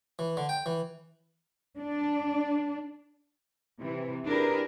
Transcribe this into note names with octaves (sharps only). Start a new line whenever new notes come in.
E3
D3
G5
E3
D4
C3 E3
D4 E4 G4 G#4 A#4 B4